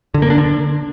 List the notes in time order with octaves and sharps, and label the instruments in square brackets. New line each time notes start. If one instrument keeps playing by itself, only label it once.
[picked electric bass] D3
A#3
D4
D3